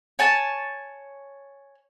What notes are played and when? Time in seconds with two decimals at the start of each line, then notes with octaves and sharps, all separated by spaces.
0.19 C#5 G#5 A5